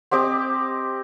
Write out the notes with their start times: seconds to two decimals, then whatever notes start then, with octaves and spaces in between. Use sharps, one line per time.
0.11 C4 G4 D#5 D6